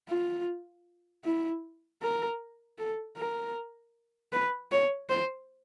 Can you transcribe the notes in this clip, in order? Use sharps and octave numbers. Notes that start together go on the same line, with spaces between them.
F4
E4
A#4
A4
A#4
B4
C#5
C5